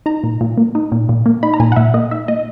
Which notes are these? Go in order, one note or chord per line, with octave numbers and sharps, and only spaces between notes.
D#4 A#5
A#2
A#2
A#3
D#4
A#2
A#2
A#3
D#4 B5
A#5
A#2 G#5
F#5
A#2 E5
A#3 D#5
D#4 E5
A#2 D#5